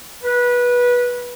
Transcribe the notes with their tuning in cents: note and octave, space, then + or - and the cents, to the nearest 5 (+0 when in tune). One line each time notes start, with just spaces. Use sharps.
B4 -20